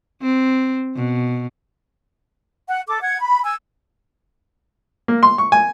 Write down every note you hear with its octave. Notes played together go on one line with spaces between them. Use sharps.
C4
B2
F#5
A4 D6
F#5 G#6
B5
G#5 E6
A#3
C6
C#6
G#5